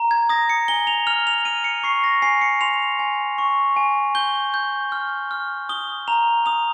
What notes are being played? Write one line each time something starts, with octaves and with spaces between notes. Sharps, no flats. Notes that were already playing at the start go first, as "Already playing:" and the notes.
Already playing: A#5
G#6
D#6 A#6
C#7
G#5 G7
F7
F6 F7
F7
F6 D#7
C#7
C#6 C7
A#6
G#5 C7
C#7
C6 F7
G#5
C#6
G#5
G6 G7
G6
F6
F6
D#6 G7
A#5 F7
D#6 F7